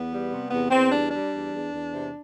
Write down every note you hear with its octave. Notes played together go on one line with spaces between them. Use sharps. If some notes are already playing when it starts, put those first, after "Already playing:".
Already playing: E2 B3
G3
C3
E2 B3
E2 C4
G3 D4
G3 D4
E2
E2
E2
C3